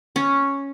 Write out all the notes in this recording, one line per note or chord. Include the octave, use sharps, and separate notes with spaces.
C#4